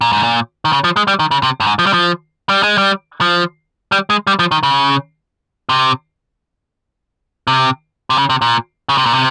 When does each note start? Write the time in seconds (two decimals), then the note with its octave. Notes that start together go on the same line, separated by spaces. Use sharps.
0.01 A#2
0.13 G#2
0.23 A#2
0.65 D#3
0.72 C#3
0.84 F3
0.96 G#3
1.08 G3
1.19 D#3
1.31 C#3
1.43 C3
1.60 G2
1.67 G#2
1.79 F3
1.86 G3
1.93 F3
2.49 G3
2.63 G#3
2.78 G3
3.21 F3
3.92 G3
4.10 G#3
4.27 G3
4.39 F3
4.51 D#3
4.63 C#3
5.69 C3
7.47 C3
8.10 C3
8.18 C#3
8.30 C3
8.42 A#2
8.89 C#3
8.98 C3
9.06 A#2
9.14 C3